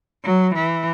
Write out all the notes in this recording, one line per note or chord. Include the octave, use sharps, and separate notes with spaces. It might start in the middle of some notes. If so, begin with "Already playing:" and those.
F#3
E3